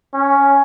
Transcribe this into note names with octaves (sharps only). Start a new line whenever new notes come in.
C#4